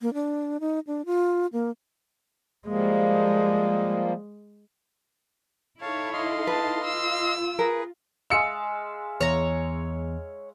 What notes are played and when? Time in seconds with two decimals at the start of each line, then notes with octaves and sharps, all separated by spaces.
0.01 A#3
0.14 D4
0.60 D#4
0.87 D4
1.06 F4
1.53 A#3
2.68 F3 G3 G#3 A#3
5.81 D#4 E4 A4 C#5 F5 A5
6.13 D#5 F5 C6
6.47 B4 A5
6.84 F4 E6
7.59 G#4 A#4 B4
8.30 G#3 E5 F5 E6 C#7
9.21 E2 C#5 A#5